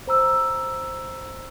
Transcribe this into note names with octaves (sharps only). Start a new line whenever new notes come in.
C5 A#5 E6